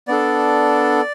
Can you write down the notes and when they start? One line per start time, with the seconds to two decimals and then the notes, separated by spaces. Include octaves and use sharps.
0.08 B3 D4 A4 D5